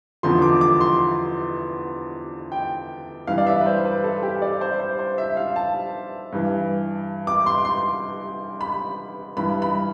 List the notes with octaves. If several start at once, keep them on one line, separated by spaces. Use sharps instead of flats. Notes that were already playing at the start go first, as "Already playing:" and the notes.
E2 D3 F3 C6
D6
D6
C6
G5
G2 E3 F5
D5
E5
B4
C5
B4
A4
G4
D5
C5
C5
C5
E5
F5
A5
G2 E3
D6
C6
C6
B5
G2 E3 B5
B5